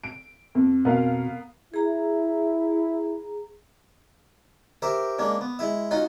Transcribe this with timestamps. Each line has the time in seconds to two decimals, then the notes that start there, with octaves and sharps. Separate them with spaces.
0.04 D7
0.55 F2
0.85 B2 B3 A#4 F5
1.74 E4 G#4 A#5
4.82 G4 A#4 C5 E5
5.19 G#3 A#3 C#4 D4
5.41 B3
5.59 G#3 E4 E5
5.91 C#4 D#4 F4 F#4 D#5 C6